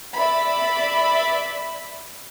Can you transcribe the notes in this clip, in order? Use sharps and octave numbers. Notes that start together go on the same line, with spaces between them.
D5 E5 B5